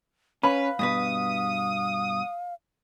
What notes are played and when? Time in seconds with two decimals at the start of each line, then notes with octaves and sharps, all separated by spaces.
0.43 C#4 B4 F5 B5
0.79 G2 B2 B4 D#6